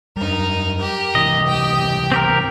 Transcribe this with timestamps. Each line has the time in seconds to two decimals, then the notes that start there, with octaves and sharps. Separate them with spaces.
0.17 F#2 G3 D#4 A#4
0.77 G4 A#4
1.15 G#2 C3 E3 D#5
1.47 G4 G5
2.12 C4 G4 A#4